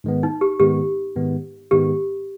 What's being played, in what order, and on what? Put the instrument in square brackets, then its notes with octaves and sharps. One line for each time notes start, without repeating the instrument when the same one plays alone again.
[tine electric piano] G#2 D#3 G#3 B3
[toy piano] D#4
G4
[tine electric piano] G#2 D#3 G#3 B3 [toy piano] G4
[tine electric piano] G#2 D#3 G#3 B3
[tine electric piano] G#2 D#3 G#3 B3 [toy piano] G4